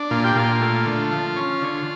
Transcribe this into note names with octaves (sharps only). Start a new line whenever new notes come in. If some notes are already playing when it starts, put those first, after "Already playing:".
Already playing: D4
A#2 F4
G4
A#2 F4
A3
D3
F3
C#4
D3